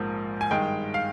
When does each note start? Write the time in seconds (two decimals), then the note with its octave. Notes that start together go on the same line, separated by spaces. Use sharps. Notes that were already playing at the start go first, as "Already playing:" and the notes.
Already playing: A#1 G#2 F3 A#3
0.41 G#5
0.51 G2 D#3 G#3 G5
0.94 F5